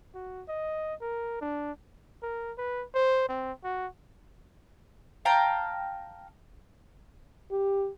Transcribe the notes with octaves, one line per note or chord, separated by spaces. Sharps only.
F#4
D#5
A#4
D4
A#4
B4
C5
C4
F#4
F5 G5 A5 A#5
G4